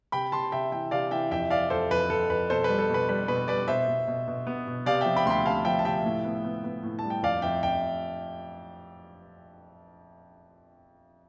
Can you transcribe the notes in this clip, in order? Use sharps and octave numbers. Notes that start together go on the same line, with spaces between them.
C3 G5 B5
C3 A5 C6
C3 E5 G5
E3 E5 G5
C3 D5 F5
E3 E5 G5
F2 E5 G5
F2 D5 F5
F2 A4 C5
F2 B4
F2 A4
F2 B4
B2 A4 C5
G3 B4
A4
B2 B4
G3 B4
B2 B4
G3 B4 D5
B2 C5 E5
B2
B2
B2
B3
B2
C3 D5 F5
F3 E5 G5
G5 B5
D2 G5 B5 C6
C3 F5 A5
F3 E5 G5
A5
C3 E5 G5
A2
B3
B3
B3
A2
G3 A5
G5
F2 D5 F5
F2 E5 G5
F2 E5 G5